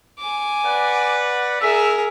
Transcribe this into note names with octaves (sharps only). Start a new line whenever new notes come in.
G#5 D6
B4 D5 F#5
G#4 A#4 E5